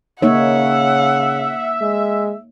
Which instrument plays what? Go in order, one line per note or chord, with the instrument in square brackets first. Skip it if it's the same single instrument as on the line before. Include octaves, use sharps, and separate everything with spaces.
[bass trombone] C#3 [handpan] A#3 D#4 C#5 [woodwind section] E5 [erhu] F#5
[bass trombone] G#3